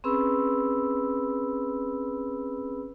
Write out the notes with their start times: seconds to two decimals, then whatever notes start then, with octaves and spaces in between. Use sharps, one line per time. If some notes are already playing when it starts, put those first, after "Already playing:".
0.04 C4 C#4 G#4 B4 B5 E6